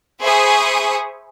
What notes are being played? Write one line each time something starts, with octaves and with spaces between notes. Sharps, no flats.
G#4 C5 E5 B5 C#6 D#6